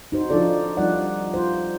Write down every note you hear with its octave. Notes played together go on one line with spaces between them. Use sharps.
D#4 F#4 C5
F3 D4 D#4 F4 A4 D5
F3 G3 D#4 F4 D5 F#5
F4 C5